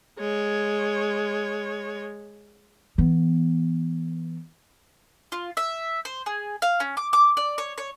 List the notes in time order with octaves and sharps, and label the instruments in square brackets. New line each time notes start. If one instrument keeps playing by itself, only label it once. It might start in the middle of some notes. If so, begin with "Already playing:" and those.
[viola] G#3 C#5
[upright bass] E3 B3
[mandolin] F4
E5
C5
G#4
F5
C#4
D6
D6
D5
C#5
C#5